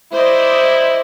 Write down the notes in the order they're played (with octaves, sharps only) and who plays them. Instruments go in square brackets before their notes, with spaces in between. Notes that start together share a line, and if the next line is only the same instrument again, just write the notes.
[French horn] E4 [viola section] C5 D5 D#5